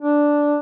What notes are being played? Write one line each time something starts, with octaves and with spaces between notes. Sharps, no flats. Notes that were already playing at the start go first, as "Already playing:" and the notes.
D4